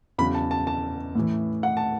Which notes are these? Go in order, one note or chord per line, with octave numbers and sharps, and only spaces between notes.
E2 C#3 F#3 B5
A5
A5
A5
A2 E3
F#5
A5